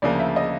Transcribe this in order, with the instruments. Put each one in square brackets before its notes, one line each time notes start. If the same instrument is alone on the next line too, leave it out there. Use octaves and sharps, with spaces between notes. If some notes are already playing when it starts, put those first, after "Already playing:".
[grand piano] D2 C#3 F3 A#3 [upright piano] D5
[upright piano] E5
D#5